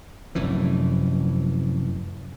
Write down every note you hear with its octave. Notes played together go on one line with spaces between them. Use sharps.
F1 F#2 A2 E3